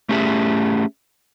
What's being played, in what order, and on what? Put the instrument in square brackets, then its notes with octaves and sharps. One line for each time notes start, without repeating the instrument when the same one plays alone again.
[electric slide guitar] A3 C#4 G4 G#4 E5